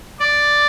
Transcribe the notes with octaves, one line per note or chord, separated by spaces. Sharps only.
D5